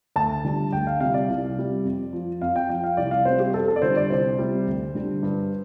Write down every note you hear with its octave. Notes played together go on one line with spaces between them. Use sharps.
D2 A5
D3 G3
D2 G5
F5
C3 G3 F5
D5
C2
C3 G3
F2
F3
F2 F5
G5
F3 G5
F5
C2 D5
F5
C3 G3 C5
G4
F2 A4
A4
D5
D3 G3 C5
D5
C2 C5
C3 G3
D2
D3 G3
G2